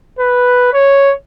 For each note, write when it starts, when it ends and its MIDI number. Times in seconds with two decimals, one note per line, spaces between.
0.19 0.71 71
0.73 1.13 73